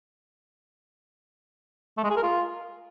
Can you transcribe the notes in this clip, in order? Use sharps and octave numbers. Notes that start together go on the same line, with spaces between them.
A3
G#3
G#4
A#4
F4